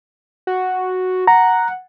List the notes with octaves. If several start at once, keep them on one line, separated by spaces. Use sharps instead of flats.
F#4
F#5 A#5